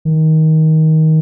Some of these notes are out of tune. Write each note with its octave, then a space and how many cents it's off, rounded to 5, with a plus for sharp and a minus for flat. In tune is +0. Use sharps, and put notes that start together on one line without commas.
D#3 +20